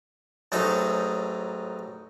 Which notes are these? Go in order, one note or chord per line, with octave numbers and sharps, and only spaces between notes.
A1 G#2 F#3 D#4 A4